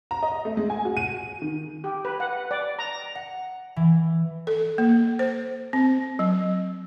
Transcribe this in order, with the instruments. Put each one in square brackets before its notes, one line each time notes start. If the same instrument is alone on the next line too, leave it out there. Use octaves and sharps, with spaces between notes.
[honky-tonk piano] A#5
D#5
A3
G#3
G#5
F#4
D#7
D#3
[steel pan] G4
B4
F#5
D5
A#5
[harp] F#5
E3
[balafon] A4
A#3
C5
C4
F#3